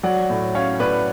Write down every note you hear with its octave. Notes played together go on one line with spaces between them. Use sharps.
F#3 D5 F#5
A2
C#4 C#5 F5
A2 B4 D5